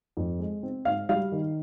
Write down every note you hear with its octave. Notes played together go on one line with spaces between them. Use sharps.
F2
G#3
C4
G#2 F5
G3 F5
D#3